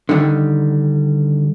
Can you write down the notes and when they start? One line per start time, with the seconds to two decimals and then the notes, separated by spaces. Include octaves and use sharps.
0.09 D3 D#3 G3